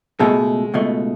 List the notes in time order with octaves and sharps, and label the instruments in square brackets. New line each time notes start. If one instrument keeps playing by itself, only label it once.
[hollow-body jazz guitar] C#2 B2 A3 [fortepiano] G#3
[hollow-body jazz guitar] C#2 B2 A3